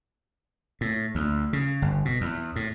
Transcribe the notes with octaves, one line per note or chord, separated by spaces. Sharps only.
A2
D2
C#3
G1
B2
E2
A2